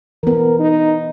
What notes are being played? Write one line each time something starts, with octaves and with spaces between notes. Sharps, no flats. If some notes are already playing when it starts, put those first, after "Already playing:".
E3 B3 A#4
D#4